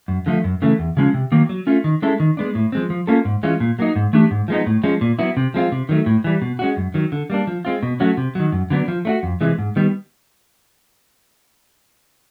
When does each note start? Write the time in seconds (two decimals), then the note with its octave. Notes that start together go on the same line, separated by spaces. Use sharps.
0.08 F#2
0.26 D3 F3 A3
0.44 F#2
0.62 C#3 E3 A3
0.79 E2
0.97 C#3 F3 G#3 C#4
1.14 C3
1.32 D#3 F#3 A#3
1.49 F#3
1.67 A3 C#4 F4
1.84 D#3
2.02 G#3 C#4 E4 A4
2.20 D#3
2.37 G#3 B3 D4
2.55 A2
2.72 F3 G#3 C4
2.90 F3
3.07 A#3 C#4 F4 A4
3.25 G#2
3.43 E3 G#3 C#4 F4
3.60 A#2
3.79 F#3 A#3 D#4
3.96 G#2
4.13 E3 A3 D4 G4
4.31 G#2
4.48 F3 G#3 B3 D#4
4.66 A2
4.83 F3 G#3 C#4
5.01 A#2
5.19 F#3 B3 E4
5.37 C3
5.54 F3 G#3 C4 F4
5.72 C3
5.89 D#3 F#3 A3
6.06 A2
6.24 E3 G3
6.42 B2
6.59 G#3 C#4 F#4
6.77 F#2
6.94 D#3 F#3
7.12 D3
7.30 G3 A#3 D4
7.47 F3
7.65 G#3 C4 F4
7.83 B2
8.00 F#3 A3 C#4 F#4
8.17 C3
8.35 D#3 F#3
8.52 F#2
8.70 D3 F#3 B3 D4
8.88 F3
9.05 A3 D4 F#4
9.23 F2
9.41 C3 E3 G#3
9.58 G#2
9.76 D#3 G3 B3